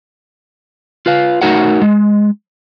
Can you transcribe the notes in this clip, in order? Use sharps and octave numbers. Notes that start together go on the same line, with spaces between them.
F4 B4 F5
A3 D#4 F#4 A#4 C#5 F#5
G#3